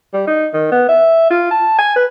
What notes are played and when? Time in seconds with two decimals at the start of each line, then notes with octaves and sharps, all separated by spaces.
0.13 G3
0.27 D#4
0.54 D#3
0.72 B3
0.89 E5
1.30 F4
1.51 A5
1.78 G#5
1.96 B4